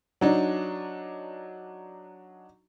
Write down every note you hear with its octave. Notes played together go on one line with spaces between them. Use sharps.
F#3 D4 D#4